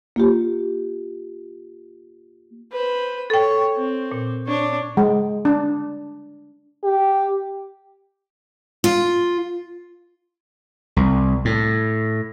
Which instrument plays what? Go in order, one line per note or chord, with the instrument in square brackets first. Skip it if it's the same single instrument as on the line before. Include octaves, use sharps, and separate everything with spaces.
[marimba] A#3 F4 G4
[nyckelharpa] B4 C5
[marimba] A4 G5 [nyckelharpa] C#5
[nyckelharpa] C4
[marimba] A#2
[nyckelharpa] D4 C#5
[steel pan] G#3
D4
[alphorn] G4
[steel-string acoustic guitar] F4
[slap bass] C2
A2